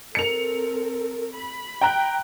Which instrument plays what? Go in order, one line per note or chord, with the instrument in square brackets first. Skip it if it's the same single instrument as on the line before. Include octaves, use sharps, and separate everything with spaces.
[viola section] C4 A4 A#4 [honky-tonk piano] C#7 F7
[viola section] B5
[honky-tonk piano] G5 A#5 F#6